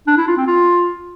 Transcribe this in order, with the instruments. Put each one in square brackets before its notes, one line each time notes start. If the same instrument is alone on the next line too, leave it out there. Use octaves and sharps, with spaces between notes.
[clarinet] D4
E4
F4
C4
F4